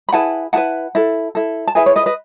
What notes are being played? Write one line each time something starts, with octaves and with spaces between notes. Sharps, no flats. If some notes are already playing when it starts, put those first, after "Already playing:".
B5
E4 G#4 B4 F#5 A5
E4 G#4 B4 F#5 A5
E4 A4
E4 A4
A5
E4 G#4 B4 E5 G#5
C#5
B4 D#5
B4 D#5